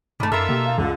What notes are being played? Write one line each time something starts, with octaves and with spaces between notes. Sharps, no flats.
G2 D#3 A3 A#5 B5 D6
F#2 D#4 F4 A4 A#4 E5
B2 A#3 G4
F5 A6
C#2 D3 F4